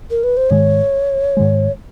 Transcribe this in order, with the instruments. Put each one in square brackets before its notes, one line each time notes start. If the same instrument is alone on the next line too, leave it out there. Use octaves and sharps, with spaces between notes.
[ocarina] A#4
B4
C5
[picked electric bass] G#2 D#3 G#3 [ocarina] C#5
[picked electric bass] G#2 D#3 G#3